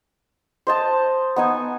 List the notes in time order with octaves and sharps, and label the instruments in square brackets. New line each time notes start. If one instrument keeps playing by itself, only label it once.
[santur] C5 D#5 A5
B3 D#4 G#5